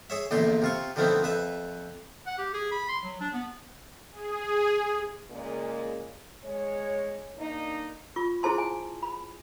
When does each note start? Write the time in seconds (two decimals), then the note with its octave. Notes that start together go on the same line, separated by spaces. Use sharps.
0.10 G#4 C#5 E5
0.31 A#1 E2 A#2 D3 A3 C6
0.62 C3 F4 C#6
0.96 D3 D#3 F3 A3 B3 C4
1.23 F2 B4 E5
2.27 F#5
2.39 G4
2.54 G#4
2.72 B5
2.89 C6
3.04 F#3
3.21 D4
3.34 B3
4.12 G#4
5.30 A#2 C#3 G#3 A#3
6.45 G#3 C#5
7.37 A#3 D4 D#4
8.16 F4 C#6
8.43 E4 G#4 C5 A5 C6
8.58 G#5
9.03 B5